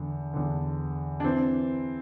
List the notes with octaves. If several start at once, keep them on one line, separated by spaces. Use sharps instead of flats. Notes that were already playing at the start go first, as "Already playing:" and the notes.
Already playing: E2 D3
E2 D3
D4
E3 C4